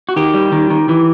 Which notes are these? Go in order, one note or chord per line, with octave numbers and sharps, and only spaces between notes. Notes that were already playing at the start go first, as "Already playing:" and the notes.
F#4
D#3 G4
G3
D#3
D#3
E3